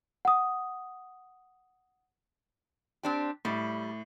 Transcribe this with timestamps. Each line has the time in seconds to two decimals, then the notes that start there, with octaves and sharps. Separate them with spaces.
0.25 F#5 D#6
3.03 C4 D4 G4
3.45 A2 G3